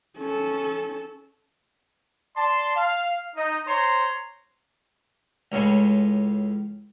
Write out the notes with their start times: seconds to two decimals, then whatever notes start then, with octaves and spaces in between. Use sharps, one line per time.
0.18 C#4 A4
2.37 D5 A5 C6
2.76 F5
3.36 D#4 D#5
3.67 C5 C#5 A#5 C6
5.52 C#2 A2 C#3